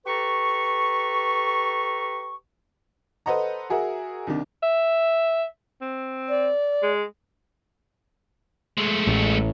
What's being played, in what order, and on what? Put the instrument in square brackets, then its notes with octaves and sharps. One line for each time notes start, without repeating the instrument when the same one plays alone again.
[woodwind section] G4 A4 B4 A#5 C#6
[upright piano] A4 B4 C5 D#5 F#5 A#5
F#4 G#4 A#4 E5 F#5
C2 D#3 D4
[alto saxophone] E5
C4
[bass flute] D5
[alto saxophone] G#3
[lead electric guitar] G#3 A3
[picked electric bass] A1